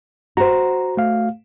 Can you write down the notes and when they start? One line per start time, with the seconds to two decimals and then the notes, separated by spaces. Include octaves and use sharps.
0.37 F#4 C5 A#5
0.97 A3 F5